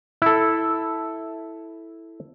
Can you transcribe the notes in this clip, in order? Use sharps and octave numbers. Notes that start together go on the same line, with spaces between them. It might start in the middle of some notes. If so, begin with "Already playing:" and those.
E4 A4